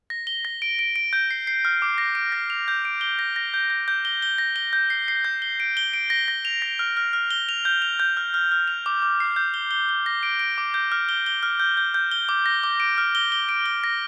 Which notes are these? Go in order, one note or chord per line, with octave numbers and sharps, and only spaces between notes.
A#6
G7
A#6
D7
D7
D7
G6
C7
C7
F6
D6
A#6
D7
A#6
F7
G6
D7
G7
A#6
A#6
G6
G6
G6
G7
G7
A#6
G7
G6
C7
C7
G6
G7
D7
G7
D7
A#6
A#6
F7
A#6
F6
F6
F6
G7
F7
G6
F7
G6
F6
F6
F6
F7
D6
D6
C7
G6
G7
G7
G7
A#6
D7
D7
D6
G6
F6
G7
G7
F6
G6
G6
G6
G7
D6
A#6
D6
D7
F6
G7
G7
D7
G7
A#6